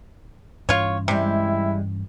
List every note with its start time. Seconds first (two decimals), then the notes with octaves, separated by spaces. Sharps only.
0.69 G2 E3 C#4 F4 C#5
1.08 C3 G3 G#3 E4